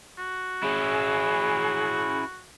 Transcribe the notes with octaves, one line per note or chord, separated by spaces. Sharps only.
F#4
C#4 E4 G#4